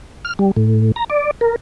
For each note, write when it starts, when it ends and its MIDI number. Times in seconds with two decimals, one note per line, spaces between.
0.25 0.34 89
0.39 0.51 55
0.57 0.92 45
0.96 1.05 82
1.10 1.31 74
1.41 1.56 70